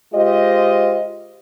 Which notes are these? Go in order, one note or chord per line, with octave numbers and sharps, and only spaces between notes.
G#3 F4 G4 C5 D#5